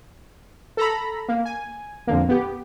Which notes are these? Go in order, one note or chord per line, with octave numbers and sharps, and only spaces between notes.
A4 A#5 B5
A#3
G#5
F2 A#2 D3 A#3
B3 G4